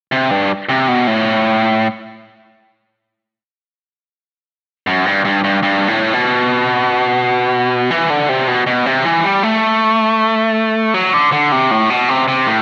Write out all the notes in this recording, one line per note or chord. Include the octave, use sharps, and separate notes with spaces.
C3
G2
C3
B2
A2
F#2
G2
G2
G2
G2
A2
B2
E3
D3
C3
B2
B2
C3
E3
G3
A3
F#3
D3
D3
C3
A2
B2
C3
C3
A2